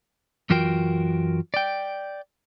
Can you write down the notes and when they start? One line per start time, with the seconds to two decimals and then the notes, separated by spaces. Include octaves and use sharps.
0.50 F#2 E3 F4 F#4 A#4 G5
1.54 D5 G5